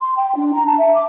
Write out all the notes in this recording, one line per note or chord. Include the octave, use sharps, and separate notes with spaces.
C6
G5
D4
A#5
A5
E5
D6